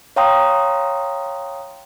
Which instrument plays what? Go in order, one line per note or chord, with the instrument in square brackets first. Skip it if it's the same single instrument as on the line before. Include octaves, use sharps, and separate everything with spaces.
[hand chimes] C#5 F5 G5 A#5 C6 D#6